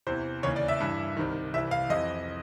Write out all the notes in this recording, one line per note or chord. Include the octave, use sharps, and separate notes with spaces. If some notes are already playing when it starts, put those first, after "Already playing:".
E2 C3 E3 C5
D#2 C#3 E3 C#5
D5
E5
G2 E3
C2 C3 D#3
C2 C3 E3 E5
F5
F2 C3 E3 D#5